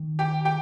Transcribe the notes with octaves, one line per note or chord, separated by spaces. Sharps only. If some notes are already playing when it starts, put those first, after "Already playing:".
Already playing: D#3
G4 G5
G4 G5